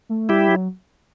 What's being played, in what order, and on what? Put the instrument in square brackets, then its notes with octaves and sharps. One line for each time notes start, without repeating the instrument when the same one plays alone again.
[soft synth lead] A3
[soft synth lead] G3 [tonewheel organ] E4 G4
[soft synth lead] F#3